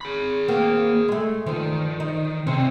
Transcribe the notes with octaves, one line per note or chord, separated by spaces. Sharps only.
G#4 B5
A#3 C4 F#4
G#3 A3
G2 D#3 F3
D#4
G2 C3 C4 C#4 C5